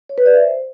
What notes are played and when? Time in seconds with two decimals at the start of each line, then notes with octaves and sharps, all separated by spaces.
0.09 C#5
0.18 B4
0.26 D5
0.34 E5
0.42 C5